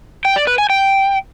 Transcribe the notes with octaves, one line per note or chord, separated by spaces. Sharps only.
G5
D5
B4
G#5
G5